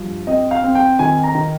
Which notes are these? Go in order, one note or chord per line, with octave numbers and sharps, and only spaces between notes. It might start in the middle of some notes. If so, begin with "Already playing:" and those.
Already playing: G2 F3
C4 D#5
F5
C4
G5
D#3 G#5
A#5
D#3